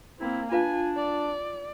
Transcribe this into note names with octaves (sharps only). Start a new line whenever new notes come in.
A#3 C4 E4
D4 F4 B4 F5 G#5
D5